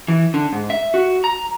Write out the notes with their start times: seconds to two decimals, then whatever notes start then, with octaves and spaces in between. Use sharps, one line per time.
0.08 E3
0.34 D3
0.53 G#2
0.70 E5
0.94 F#4
1.24 A#5